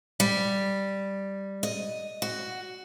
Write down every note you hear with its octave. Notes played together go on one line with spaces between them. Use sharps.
G3
D#5
F#4